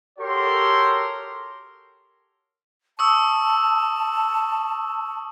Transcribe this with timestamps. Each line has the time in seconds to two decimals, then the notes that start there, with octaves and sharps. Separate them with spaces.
0.19 F#4 G4 A4 A#4 C#5 C6
2.99 A5 C#6 D#6 E6